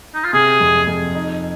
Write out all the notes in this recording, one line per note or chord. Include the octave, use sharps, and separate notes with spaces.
D#4
F4
C3 G#4
F2
F2
D#4